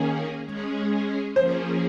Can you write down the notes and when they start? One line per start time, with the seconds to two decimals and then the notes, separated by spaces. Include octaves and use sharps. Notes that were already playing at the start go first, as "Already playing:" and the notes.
Already playing: D#3 A#3 C#4 G#4
0.45 G#3 C#4 G#4
1.36 F3 A#3 C#4 G#4 C5